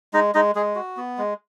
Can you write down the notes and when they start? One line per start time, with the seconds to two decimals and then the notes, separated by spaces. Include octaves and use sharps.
0.13 G#3 D#4 D#5
0.34 G#3 D#4 D#5
0.55 G#3 G#4
0.75 F#4
0.97 B3
1.18 G#3